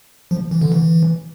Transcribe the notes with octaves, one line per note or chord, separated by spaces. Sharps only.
F3
E3
D3
E3